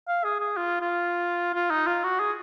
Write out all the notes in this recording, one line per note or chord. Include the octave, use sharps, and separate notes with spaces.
F5
G#4
G#4
F4
F4
F4
D#4
F4
F#4
G#4